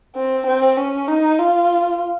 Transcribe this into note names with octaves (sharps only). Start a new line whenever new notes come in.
C4
C4
C#4
D#4
F4